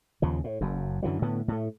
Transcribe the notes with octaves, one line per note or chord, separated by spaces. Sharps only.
D#2 C#3 F3
A2
F#1 F#2
F#2 D3 E3 F#3
A2 D3 B3
A2 A3